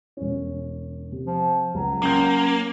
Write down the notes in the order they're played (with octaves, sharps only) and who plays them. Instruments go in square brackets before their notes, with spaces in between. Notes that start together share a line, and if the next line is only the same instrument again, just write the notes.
[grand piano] E1 C#4
C3
[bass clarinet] F3
[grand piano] C#2 [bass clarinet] F#3
[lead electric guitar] A#3 [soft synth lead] C#4 [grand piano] G5 C6 G6